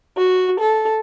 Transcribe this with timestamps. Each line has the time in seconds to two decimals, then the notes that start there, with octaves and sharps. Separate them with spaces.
0.16 F#4
0.59 A4